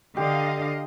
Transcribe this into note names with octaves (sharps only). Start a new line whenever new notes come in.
D3 G4 D#5 F5